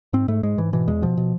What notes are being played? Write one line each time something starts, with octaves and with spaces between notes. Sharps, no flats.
G#2 C4
G#2 A3
G#2 G#3
G#2 E3
B2 E3
E2 G#3
B2 F3
B2